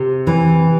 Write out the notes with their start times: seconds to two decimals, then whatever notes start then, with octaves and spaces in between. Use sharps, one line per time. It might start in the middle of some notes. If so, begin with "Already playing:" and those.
Already playing: C3
0.27 E3